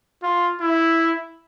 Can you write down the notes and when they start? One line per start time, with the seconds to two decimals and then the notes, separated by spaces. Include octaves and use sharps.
0.23 F4
0.61 E4